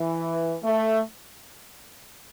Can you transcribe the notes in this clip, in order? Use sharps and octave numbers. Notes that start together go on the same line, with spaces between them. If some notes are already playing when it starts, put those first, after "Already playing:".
Already playing: E3
A3